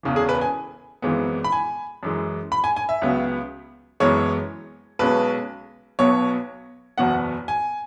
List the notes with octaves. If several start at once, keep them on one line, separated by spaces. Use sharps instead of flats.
E1 E2 C#3 E3
G#4
B4
G#5
G#1 F#2 E3 G#3 B3
B5
G#5
F#2 E3 G#3
B5
G#5
G#5
E5
C#2 C#3 F#3 B3
F#1 F#2 E3 G#3 B3 C#5
B1 B2 G#3 C#4 B4
B1 B2 F#3 B3 C#5
F#1 E2 B2 F#3 B3 F#5
G#5